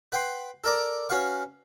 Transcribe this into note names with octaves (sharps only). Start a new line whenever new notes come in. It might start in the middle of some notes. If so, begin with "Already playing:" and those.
B4 F#5 G5 C6
A4 A#4 D5 A#5
C#4 F#4 B4 F5 C#6